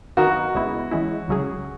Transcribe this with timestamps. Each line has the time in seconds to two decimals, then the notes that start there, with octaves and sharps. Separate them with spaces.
0.17 D#3 F#3 B3 D#4 F#4 A#4
0.55 C#2 C#3 G#3 B3 E4
0.91 E3 G#3 C#4 E4
1.28 C#2 C#3 F#3 C#4 G#4